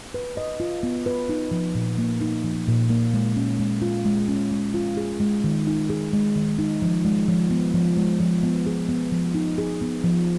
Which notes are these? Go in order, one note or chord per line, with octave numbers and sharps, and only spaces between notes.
B4
D#5
F4
B3
B4
D#4
F3
A#2
A#3
D#4
F3
A#2
A#3
G#3
C#4
G#3
F4
G#3
C#4
G#3
F4
G#4
G#3
D#3
D#4
G#4
G#3
D#3
D#4
F3
G#3
F3
B3
F3
G#3
F3
B3
G#4
B3
F3
D#4
G#4
B3
F3